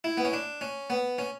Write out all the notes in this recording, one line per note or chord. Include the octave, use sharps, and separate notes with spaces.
E4
B3
C#4
D4
C#4
B3
C#4